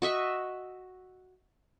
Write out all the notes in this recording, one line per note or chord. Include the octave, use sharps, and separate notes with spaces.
F#4 D#5 E5 C#6